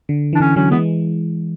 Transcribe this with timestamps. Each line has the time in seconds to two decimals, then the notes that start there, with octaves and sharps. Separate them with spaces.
0.09 D3
0.33 E3 D4
0.40 D3 C#4
0.56 D3 F#3 C#4
0.71 E3 G#3 B3